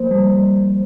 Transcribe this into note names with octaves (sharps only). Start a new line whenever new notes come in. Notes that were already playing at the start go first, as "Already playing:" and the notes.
Already playing: F3 A#3 C5
G3